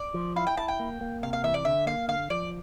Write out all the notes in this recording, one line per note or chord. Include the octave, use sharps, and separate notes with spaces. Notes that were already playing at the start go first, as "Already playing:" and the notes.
Already playing: D5
F3
E4 F5
G5
E4 A5
G5
A#3
A#3
C3 F5
F5
E3 E5
D5
D3 E5
A#3 F5
D3 F5
F3 D5